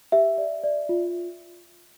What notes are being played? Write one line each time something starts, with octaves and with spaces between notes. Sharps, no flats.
G4 E5
D5
D5
F4